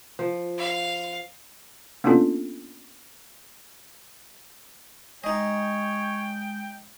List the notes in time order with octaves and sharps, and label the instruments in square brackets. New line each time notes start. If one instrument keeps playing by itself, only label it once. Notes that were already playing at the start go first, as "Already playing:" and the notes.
[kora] F3
[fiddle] F5
[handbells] A#3 B3 C#4 D4 F4 A4
[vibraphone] G#3 [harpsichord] D#4 D#5 [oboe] C#5 [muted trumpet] G5